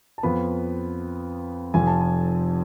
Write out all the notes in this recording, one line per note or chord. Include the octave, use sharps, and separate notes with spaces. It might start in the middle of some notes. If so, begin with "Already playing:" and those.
A5
F2 F3 B3 B5
F1 F2 F3 G#5
A5
G#5